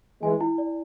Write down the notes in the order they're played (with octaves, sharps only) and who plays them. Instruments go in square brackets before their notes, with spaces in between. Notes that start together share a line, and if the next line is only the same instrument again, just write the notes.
[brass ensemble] E3 G#3 [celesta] G#5
[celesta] E4
D5